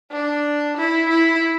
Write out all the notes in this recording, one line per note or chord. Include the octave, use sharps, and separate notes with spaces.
D4
E4
E4